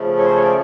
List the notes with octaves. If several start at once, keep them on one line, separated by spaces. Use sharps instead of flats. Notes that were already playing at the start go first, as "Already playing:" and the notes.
Already playing: C#3 F3 A3
C#5
C5
C#5
D5